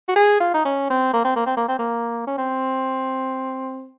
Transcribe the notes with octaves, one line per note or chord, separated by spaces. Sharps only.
F#4
G#4
F4
D#4
C#4
C4
A#3
C4
A#3
C4
A#3
C4
A#3
C#4
C4